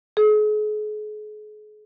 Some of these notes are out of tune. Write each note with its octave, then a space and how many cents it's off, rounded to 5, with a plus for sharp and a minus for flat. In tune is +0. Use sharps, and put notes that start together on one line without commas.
G#4 +40